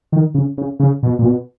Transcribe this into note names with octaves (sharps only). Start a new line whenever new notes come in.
D#3
C#3
C#3
C#3
B2
A#2
B2